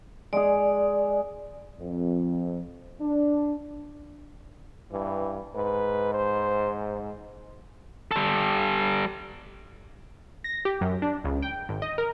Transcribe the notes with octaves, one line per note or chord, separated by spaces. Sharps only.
G#3 G#4 D5
F2
D4
G2 E3
G#2 B4
C5
G3 A4
A#6
G4
F#2
D4
C#2
G5
G#1
D#5
A#4